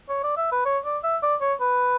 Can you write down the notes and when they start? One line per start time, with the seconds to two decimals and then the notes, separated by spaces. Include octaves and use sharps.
0.09 C#5
0.23 D5
0.37 E5
0.52 B4
0.65 C#5
0.85 D5
1.04 E5
1.23 D5
1.41 C#5
1.60 B4